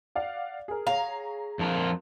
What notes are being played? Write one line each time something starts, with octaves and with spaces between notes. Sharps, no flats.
D5 F5 F#5
G#4 A#4
G#4 C#5 F5 A#5
F2 F3 A#4